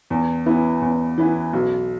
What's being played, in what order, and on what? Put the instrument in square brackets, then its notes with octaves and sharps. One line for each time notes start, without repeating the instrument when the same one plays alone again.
[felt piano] E2
E3 B3 E4
E2
E3 B3 E4
B1